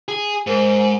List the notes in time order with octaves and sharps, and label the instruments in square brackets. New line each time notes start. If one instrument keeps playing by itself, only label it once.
[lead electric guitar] G#4
[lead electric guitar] G#2 [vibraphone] A#4 C5